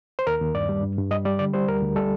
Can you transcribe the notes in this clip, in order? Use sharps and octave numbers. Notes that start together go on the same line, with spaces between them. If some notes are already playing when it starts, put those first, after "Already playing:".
C5
D#2 A#4
D#2
G2 D5
G3
G2
G2
G3 D#5
G3 D5
D3 D5
G3 C5
D2 A#4
D2
G3 A4